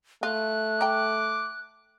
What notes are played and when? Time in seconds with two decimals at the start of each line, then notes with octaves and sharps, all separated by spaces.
0.23 A3 F4 F#6
0.81 G5 A#5 D6